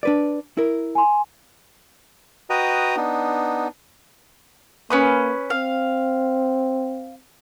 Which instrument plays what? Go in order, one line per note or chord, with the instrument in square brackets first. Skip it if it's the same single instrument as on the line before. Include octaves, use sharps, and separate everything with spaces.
[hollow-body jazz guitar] D4 B4 D5
E4 A#4
[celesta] G#5 C6
[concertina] F#4 B4 D#5 G5 A#5 D#6
B3 D4 D#4
[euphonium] A#3 [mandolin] C#4 B4 D#6
[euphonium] C4 [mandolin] F5